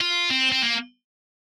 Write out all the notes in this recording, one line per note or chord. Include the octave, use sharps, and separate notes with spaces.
F4
C4
C4
A#3